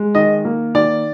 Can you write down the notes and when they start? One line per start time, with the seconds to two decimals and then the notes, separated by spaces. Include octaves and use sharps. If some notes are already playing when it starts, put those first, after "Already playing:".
Already playing: G#3
0.15 D#3 D#5
0.45 A#3
0.75 D#3 D5